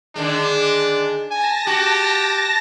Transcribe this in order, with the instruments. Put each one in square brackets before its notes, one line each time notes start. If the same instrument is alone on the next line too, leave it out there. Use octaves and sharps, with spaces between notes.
[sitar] D3 D#3 G#3 [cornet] D4
[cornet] G#5 [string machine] A5 A#6
[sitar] F#4 [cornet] G4